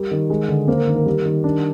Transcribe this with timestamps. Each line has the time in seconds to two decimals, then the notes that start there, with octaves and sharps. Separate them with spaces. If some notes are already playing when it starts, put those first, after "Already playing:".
Already playing: G3 A#4
0.11 D#3
0.30 G#3
0.48 D3
0.68 A#3 C5
0.78 A#4
0.87 D#3
0.96 A#4
1.06 G3
1.25 D#3
1.44 D4